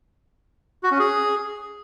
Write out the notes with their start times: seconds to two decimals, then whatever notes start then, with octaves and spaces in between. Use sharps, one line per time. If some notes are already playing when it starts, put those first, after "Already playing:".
0.83 F#4
0.91 C#4
0.99 G#4